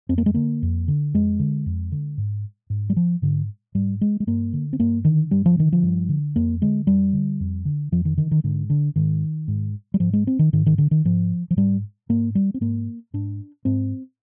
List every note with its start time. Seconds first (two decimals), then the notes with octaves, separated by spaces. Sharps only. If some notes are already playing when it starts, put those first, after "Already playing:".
0.09 F2 C4
0.18 A#3
0.26 G#3
0.34 D3 A#3
0.62 F2
0.88 D3
1.14 F2 G#3
1.39 D3
1.66 F2
1.92 D3
2.18 G#2
2.70 G#2
2.90 G3
2.97 F3
3.22 G#2 D3
3.75 G#2 G3
4.01 G#3
4.20 G#3
4.27 G2 A#3
4.53 D3
4.73 C4
4.80 G2 A#3
5.05 D3 D#3
5.31 G2 G3
5.46 F3
5.57 D3 D#3
5.73 F3
5.83 G2
6.09 D3
6.36 F2 A#3
6.61 D3 G#3
6.87 F2 G3
7.13 D3
7.40 F2
7.65 D3
7.92 F2 F3
8.05 D#3
8.17 D3 D#3
8.31 D#3
8.44 G#2 D3
8.70 D3
8.96 G#2 D#3
9.48 G#2
9.94 G3
10.00 G#2 F3
10.13 G#3
10.27 C4
10.39 D#3
10.53 G#2 D#3
10.66 D#3
10.78 D3
10.91 D#3
11.05 G#2 F3
11.51 F3
11.56 G#2 G3
12.09 G#2 A#3
12.35 G3
12.54 C4
12.61 G#2 A#3
13.14 G#2 D4
13.65 G#2 C4